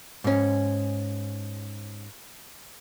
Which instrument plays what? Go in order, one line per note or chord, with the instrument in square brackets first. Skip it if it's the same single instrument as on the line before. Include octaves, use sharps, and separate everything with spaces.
[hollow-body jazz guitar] G#2 C#4